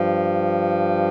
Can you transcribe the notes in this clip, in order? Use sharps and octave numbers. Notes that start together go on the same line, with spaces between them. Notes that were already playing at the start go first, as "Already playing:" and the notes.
Already playing: G2 F3